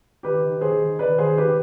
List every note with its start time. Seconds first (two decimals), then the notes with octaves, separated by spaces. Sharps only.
0.23 D#3 G4 B4
0.42 D#3
0.61 D#2 G#4 C5
0.80 D#3
0.99 D#3 B4 D5
1.18 D#2 G#4 C5
1.38 D#3 G4 B4